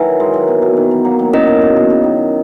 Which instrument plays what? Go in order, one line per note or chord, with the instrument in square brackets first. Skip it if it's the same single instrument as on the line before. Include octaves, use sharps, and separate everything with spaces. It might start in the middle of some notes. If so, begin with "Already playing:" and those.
Already playing: [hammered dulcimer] D#3 F#3 [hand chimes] E4 B4 E5 G#5
[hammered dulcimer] E3 G#3
D#3 F#3
B2
B2
D#3
E3
F#3 A#3
D#3 F#3
[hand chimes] C#4 E4 A#4 D#5
[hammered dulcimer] B2
A#2
B2
C#3
D#3